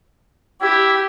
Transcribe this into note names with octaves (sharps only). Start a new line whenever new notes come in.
E4 G4